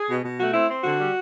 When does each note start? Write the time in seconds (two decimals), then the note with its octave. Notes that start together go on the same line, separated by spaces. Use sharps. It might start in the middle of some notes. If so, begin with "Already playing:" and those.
Already playing: G#4
0.09 B2
0.24 B2
0.39 A3 F#4
0.54 C4 E4
0.69 C4
0.84 D3 F#4
0.99 G3